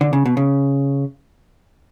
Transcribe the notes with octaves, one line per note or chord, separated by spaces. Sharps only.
D3
C#3
B2
C#3